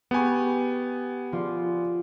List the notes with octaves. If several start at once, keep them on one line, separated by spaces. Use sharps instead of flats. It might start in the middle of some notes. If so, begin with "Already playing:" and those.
B3 G4 G#5 B5 C#6
F3 F4 D5